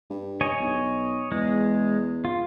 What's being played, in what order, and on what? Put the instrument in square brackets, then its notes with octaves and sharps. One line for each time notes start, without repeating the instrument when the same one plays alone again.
[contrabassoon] G2
[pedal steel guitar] C#5 D#5 G#5
[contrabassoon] B1
[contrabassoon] E2 [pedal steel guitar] G#3
[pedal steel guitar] F4